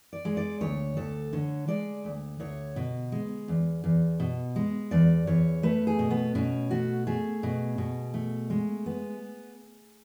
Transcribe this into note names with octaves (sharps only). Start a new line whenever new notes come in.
D5
G#3
D5
D2 C#5
D2 A4
D3 C#5
G#3 D5
D2
D2 C#5
B2
G#3
E2
E2
B2
G#3
E2 D5
E2 C#5
A3 B4
G#4
B2
B3
B2 C#4
A3 F#4
A3 G#4
B2
B2
A3
G#3
B3